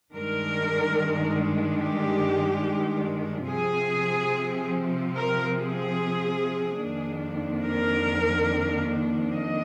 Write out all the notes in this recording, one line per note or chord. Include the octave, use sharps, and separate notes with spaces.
G2 D#3 G#3 D4 A#4
G4
C3 F3 C4 G#4
A#4
G#4
F2 D#3 A#3 D4
A#4
D#5